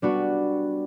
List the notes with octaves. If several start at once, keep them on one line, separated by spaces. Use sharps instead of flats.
G3 B3 D4 F#4